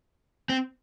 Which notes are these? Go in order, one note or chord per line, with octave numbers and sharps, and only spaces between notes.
C4